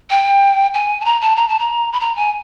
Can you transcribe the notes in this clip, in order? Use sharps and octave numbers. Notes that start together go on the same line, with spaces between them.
G5
G#5
A5
A#5
A5
A#5
A5
A#5
B5
A#5
G#5